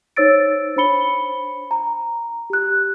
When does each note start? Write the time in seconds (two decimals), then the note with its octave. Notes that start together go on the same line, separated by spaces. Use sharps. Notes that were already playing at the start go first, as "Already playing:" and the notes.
0.16 D#4 C5 C#5 E6 A6 D7
0.76 D4 C5 C#5 B5 C#7 G7
1.71 A#5
2.50 G4 F#6